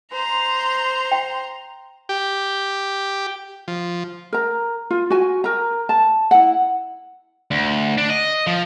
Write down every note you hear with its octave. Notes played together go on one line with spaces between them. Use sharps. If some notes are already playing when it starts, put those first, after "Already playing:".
C5 A#5 C6
G5
G4
F3
A#4 A#5
F4
F#4 G#5
A#4 A#5
A5
E4 F#5
D2
D4
D#5
F3